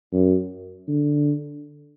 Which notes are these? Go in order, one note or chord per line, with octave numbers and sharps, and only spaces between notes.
F#2
D3